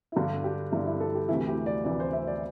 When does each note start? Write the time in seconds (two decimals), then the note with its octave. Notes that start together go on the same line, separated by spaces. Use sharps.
0.12 E4
0.16 G2 D3 G4
0.44 G4
0.72 G2 D3 E4
0.87 E4
1.00 A4
1.15 G4
1.29 D2 C3 E3 E4
1.47 G4
1.66 D5
1.84 D2 C3 E3 D5
2.00 C5
2.13 E5
2.27 D5